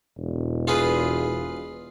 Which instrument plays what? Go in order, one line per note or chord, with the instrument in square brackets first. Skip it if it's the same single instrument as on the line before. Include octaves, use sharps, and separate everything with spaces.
[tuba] E1
[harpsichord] F4 G#4 B4